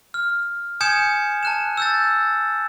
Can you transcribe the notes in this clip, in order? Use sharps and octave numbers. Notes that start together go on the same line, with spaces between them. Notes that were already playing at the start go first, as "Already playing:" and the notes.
F6
G#5 D#6 G6 G#6 C#7 E7
A5 F#6 E7
E6 G6 A6